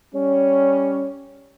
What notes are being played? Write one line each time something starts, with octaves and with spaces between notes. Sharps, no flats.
G3 C#4